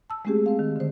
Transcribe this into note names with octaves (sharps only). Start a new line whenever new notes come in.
A5 E6
G#3 A3 C4 C#4 G4 G#4
C4 F5
D#3
D3 C5